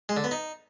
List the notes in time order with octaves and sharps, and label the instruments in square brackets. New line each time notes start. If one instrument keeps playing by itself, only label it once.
[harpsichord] G#3
D3
B3
D#4